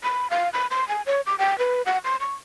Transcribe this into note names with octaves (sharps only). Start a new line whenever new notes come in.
B5
F5
B5
C6
G#5
C#5
D6
G5
B4
F#5
C6
C#6